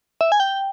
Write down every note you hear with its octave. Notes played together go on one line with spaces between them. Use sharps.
E5
G#5
G5